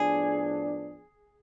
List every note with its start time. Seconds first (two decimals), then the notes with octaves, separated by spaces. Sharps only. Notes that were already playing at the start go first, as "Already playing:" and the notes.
Already playing: A2 F3 B3 D4 G#4